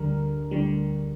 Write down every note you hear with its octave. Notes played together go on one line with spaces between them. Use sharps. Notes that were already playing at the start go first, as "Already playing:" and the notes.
Already playing: D2 D3 G3 A#4
D2 D3 G3